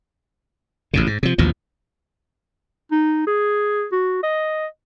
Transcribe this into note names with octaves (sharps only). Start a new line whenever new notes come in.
A1 F2 C#3
G#2
C3 F3
A1 D#2 B2 F3
D#4
G#4
F#4
D#5